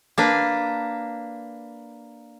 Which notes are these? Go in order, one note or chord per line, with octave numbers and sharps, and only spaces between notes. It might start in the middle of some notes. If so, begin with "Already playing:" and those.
A#3 D4 B4